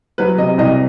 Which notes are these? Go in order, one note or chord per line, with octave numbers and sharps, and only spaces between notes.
F#3 B4
C3 D#5
C2 D#5